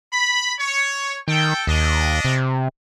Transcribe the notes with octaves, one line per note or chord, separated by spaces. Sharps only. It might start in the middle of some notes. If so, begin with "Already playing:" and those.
B5
C#5
D#3 A4 G5
D#2 D4 D#5
C3